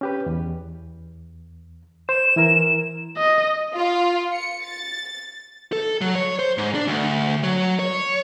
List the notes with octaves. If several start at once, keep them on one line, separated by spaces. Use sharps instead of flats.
C#4 G4 B4
E2
C5 E7
E3 E4 A#4
D#5
F4
C#7
A6
A4
F#3
C#5
C5
G#2
D4
D2
F#3
C#5